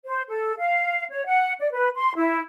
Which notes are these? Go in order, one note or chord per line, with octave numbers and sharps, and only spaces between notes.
C5
A4
F5
C#5
F#5
D5
B4
C6
E4